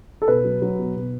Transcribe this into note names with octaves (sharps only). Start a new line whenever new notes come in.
A4
B2 B4
F#3
F#3
B2
B2